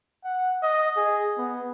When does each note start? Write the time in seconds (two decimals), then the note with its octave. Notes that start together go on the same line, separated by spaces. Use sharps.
0.24 F#5
0.63 D#5
0.97 G#4
1.38 B3